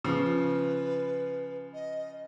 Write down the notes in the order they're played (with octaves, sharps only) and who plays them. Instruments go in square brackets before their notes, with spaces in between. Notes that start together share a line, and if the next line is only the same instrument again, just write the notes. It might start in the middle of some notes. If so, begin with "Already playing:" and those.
[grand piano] C#3 F3 [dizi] B4
[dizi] D#5